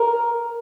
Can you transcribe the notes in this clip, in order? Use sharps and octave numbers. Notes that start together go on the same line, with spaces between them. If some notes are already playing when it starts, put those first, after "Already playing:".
Already playing: A#4